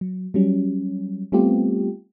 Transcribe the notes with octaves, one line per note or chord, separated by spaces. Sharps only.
F#3
F#3 G3 C#4
G3 A3 B3 C4 F4 G4